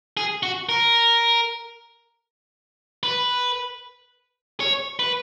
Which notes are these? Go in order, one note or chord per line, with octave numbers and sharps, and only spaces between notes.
G#4
F#4
A#4
B4
C#5
B4